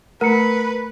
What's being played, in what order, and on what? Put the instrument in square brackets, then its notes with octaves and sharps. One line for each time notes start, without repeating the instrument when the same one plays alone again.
[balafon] A3 [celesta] A#4 A#5 C#7 [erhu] B4